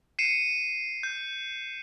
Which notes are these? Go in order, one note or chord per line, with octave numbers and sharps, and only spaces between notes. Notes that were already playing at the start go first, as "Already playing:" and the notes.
C7 C#7 D#7 E7
G6